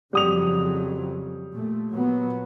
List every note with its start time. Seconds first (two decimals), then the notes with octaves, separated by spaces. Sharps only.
0.13 F2 C#3 F#3 G3 D#6 F7
1.55 A#2 A3
1.90 A#2 F#3 B3